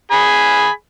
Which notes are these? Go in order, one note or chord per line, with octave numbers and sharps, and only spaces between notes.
G#4 G#5 B5